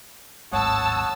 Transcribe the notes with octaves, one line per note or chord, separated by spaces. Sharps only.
D1 G#1 G#2 C#5 F#5 A5 D#6 E6